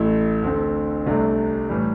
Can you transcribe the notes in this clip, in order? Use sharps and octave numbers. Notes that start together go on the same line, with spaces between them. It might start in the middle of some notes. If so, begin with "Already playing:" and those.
Already playing: A1 A2 A3 E4
D2 D3 C4 A4
C2 C3 A3 D4
A2 E3 G3